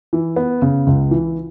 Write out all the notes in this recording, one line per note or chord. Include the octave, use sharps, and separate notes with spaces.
E3
B3
C#3
C#2
E3